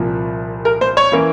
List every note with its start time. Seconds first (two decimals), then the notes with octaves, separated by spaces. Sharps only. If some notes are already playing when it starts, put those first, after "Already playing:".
Already playing: C2 A#2 F3
0.65 A#4
0.81 C5
0.97 C#5
1.12 E3 A#3 C#4 E4